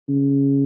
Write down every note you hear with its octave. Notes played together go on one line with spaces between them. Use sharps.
C#3